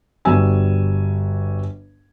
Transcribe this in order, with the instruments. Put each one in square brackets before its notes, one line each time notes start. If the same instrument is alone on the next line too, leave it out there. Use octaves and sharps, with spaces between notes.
[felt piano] G1 G3 F#4 G#5 E6